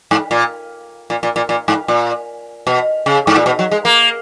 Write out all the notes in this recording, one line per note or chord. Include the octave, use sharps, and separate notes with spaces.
G#2
A#2
A#2
A#2
A#2
A#2
G#2
A#2
B2
C#3
G#2
A#2
B2
F#3
G#3
A#3